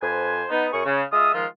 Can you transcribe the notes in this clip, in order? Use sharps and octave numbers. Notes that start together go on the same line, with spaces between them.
F2 B4 C5 G#5
B3 D#4
F#2 G#4 C#6
C#3
G#3 F4 E5 D#6
D#3 F3 G#3 F4